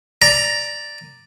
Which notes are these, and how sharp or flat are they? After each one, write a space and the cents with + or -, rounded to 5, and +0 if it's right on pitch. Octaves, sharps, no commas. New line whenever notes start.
D5 +0 A#5 +0